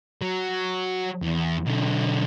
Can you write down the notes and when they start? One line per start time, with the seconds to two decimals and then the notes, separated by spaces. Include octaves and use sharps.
0.21 F#3
1.22 E2
1.66 B1 D3